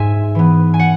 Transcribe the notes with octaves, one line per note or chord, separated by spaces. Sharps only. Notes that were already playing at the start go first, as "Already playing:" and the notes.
Already playing: G#2 E5 G#5
E3 B3
G#5
F#5